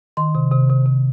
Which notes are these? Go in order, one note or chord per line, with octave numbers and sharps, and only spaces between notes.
D#3 C6
C3
C3
C3
C3